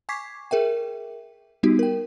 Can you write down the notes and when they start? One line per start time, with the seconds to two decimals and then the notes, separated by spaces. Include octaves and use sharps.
0.09 G#5 C#6 D6 G#6 B6 C7
0.51 G#4 A#4 E5 G5
1.63 G3 B3 D#4 F#4 G4
1.79 A#4 G5